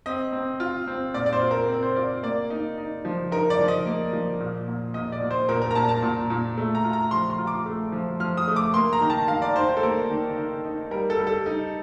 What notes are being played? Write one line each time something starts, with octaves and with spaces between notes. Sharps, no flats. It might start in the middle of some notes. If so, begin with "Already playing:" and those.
C4 D#5
C4
F4
C4
A#2 D5
D5
C5
F4
A#4
C4
C5
F4 D5
A#3 D5
D#4
D#4
F3
D#4 A#4
D5
F3
D#5
A#3
F3
A#2
A#2
A#2 D#5
D5
A#2
C5
A#2 A#4
A#4
A#5
A#2 A5
A5
A#2
A#2
A3
A#5
F4
A#5
F3 C6
C6
F4
D6
A3
F3
F3 F6
D#6
A3
D6
A#3 C6
A#5
D#3
A5
D#3 F5
D5
D#3 C5
C5
A4
A#3 A#4
D#3
D#3
D#4
G3 A#4
A4
G3
A4
D#4